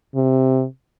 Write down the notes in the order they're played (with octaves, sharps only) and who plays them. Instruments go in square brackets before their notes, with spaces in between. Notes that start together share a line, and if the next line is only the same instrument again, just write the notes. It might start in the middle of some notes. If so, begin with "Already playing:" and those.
[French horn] C3